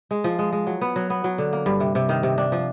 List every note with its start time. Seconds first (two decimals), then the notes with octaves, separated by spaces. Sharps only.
0.11 G#3
0.24 F3
0.39 G#3
0.53 G#3
0.67 F#3
0.81 B3
0.96 F#3
1.10 B3
1.24 F#3
1.38 D3
1.53 A#3
1.66 G2
1.80 C3
1.95 C3
2.09 D#3
2.23 C3
2.38 D4
2.52 F3